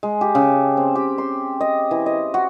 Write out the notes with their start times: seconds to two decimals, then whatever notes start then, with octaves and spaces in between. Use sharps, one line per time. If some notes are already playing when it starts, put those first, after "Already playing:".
0.03 G#3
0.21 G4
0.35 C#3
0.77 C4
0.95 G4
1.18 C6
1.61 D#5
1.91 E3
2.06 D#5
2.34 F#4